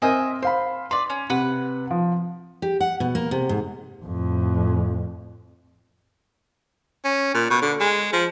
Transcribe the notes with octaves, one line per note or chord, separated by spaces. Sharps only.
C4 A#4 C5 D#5 E5 G#5
C5 F5 B5 C6
B4 D5 C6
C#4
C3 B4 F#5
F3
G4
F#5
B2
A#3
C3
G#2
F2 A2
C#4
A#2
B2
D3
G#3
F3